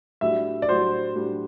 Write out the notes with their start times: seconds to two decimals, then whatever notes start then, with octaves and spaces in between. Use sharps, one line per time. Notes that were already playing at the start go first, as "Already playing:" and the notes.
0.21 A2 G3 D4 F#4 E5
0.62 D5
0.69 A2 G3 D4 F#4 C5
1.15 A2 G3 D4 F#4